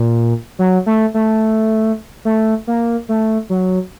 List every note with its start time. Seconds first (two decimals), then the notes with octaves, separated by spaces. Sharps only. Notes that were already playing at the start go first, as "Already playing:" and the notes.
Already playing: A#2
0.59 F#3
0.86 A3
1.14 A3
2.25 A3
2.67 A#3
3.09 A3
3.50 F#3